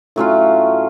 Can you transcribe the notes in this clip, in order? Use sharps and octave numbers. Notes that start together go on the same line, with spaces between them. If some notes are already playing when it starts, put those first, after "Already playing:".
A2 F#3 C#4 F4